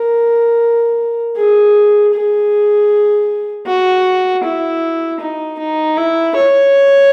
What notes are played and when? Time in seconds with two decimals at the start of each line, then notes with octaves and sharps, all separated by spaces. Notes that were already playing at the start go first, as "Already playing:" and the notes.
Already playing: A#4
1.37 G#4
2.14 G#4
3.67 F#4
4.44 E4
5.20 D#4
5.59 D#4
5.97 E4
6.36 C#5